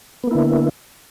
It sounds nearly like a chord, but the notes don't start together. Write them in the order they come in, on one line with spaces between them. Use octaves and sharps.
B3 A#3 E4 D3